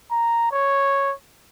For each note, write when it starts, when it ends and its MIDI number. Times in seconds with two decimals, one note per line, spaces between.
0.11 0.49 82
0.52 1.13 73